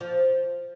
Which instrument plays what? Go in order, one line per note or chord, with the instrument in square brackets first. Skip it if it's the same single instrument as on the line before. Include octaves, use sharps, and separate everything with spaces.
[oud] F3